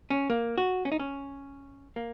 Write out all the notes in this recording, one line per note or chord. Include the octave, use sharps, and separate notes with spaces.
C#4
A#3
F#4
C#4
D#4
C#4
A#3